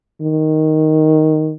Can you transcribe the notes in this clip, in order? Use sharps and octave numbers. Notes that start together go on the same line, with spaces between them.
D#3